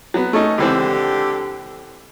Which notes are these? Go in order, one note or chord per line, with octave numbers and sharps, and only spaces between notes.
F#3 B3
A3 C#4 D#4
C#2 D3 E3 C4 G4